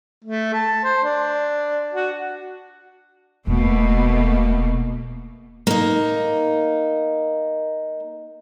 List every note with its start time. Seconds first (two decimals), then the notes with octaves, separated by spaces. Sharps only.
0.24 A3
0.54 A5
0.84 C5
1.04 D4
1.93 F#4
3.47 E1 B2 A3 A#3
5.67 A#3 D#4